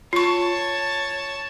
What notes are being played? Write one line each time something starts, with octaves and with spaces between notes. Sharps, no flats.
F4 C#5 A5 C#6